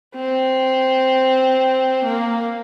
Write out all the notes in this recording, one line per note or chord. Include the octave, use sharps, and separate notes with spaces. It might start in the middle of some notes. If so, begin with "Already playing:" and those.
C4
A#3